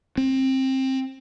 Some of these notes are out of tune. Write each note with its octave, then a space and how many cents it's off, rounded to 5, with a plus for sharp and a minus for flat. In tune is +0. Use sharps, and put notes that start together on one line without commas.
C4 +20